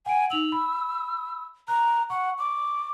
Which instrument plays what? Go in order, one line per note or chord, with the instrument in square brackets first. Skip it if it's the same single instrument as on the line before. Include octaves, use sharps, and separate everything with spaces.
[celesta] F#5 D7 [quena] G#5
[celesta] D#4 F7 F#7 [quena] E6
[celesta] B5
[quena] A#5 [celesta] F#6
[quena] F#5 [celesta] C#6
[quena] D6